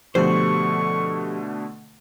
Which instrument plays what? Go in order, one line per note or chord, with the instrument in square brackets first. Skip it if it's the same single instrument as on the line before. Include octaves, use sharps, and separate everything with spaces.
[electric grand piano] B2 D3 A3 [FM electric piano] F3 G4 [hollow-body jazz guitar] C5 [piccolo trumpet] C#6